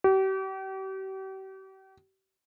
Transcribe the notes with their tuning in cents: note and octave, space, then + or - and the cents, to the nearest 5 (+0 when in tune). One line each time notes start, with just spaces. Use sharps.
G4 -40